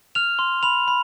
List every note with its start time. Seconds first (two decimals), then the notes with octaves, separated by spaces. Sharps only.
0.15 F6 F7
0.39 C6
0.63 B5 F7
0.88 B5